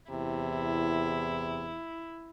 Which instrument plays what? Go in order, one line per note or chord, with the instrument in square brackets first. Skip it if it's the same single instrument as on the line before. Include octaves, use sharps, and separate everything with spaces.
[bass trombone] E2 [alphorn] C3 [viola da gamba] E4